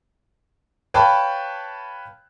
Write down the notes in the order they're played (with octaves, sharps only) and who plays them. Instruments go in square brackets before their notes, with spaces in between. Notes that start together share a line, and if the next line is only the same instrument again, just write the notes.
[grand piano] B4 C#5 F5 G5 A5 B5